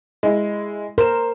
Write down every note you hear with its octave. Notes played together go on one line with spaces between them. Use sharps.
G#3 E4
A#4 C5 E7